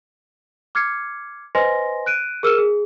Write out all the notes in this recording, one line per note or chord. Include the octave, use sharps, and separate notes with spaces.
D6 F6 G#6 C7 C#7
B4 C5 D#5 G#5 C6 A#6
F#6 D7 D#7
G#4 A#4 E6 F6 D#7 E7
G#4